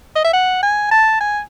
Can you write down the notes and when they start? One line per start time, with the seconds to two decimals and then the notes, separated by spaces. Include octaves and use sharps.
0.16 D#5
0.25 E5
0.33 F#5
0.62 G#5
0.91 A5
1.20 G#5